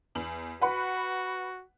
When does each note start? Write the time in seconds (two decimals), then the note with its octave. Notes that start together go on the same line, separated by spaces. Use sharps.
0.15 E2 F#7
0.62 F#4 B4 F#5 B5